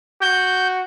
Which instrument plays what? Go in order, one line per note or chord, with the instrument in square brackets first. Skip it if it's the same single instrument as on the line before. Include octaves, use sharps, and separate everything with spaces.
[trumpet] F#4 [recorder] G6